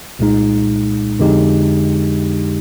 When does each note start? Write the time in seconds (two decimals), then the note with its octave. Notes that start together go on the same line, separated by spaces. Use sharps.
0.19 C2 A#2 G#3 D#4
1.19 F2 D3 G#3 D#4 G4